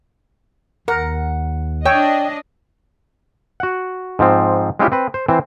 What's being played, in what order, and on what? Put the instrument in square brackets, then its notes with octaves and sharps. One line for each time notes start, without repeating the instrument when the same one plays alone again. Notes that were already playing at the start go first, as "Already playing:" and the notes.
[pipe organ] D#2 [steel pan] A#4 [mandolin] F#5
[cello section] D4 D#5 [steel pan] C#5 [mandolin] G5 E6 G6
[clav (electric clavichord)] F#4 F#5
G#2 F3 C4
G#3 C4 C#4 E4 F4 G4
C4 B4
C5
E3 C4 C5